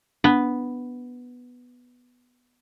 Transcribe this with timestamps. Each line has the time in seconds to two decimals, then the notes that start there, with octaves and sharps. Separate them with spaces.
0.24 B3 D4